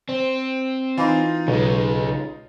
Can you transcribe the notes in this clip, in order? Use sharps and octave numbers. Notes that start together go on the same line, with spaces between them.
C4 C5
E3 D#4 F4
B1 C#3 G#3